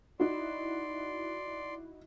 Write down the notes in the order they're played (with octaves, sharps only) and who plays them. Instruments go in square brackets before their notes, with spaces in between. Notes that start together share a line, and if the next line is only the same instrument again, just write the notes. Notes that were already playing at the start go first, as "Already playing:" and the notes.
[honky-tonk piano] D#4 E4 F#4 [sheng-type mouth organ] D5 C6